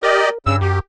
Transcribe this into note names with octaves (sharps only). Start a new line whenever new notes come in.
G4 A#4 D5 D#5
G2 C#3 E6
F#2 G4